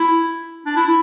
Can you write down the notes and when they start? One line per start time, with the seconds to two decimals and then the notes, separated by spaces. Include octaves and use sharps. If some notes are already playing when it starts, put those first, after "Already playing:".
Already playing: E4
0.66 D4
0.76 E4
0.86 E4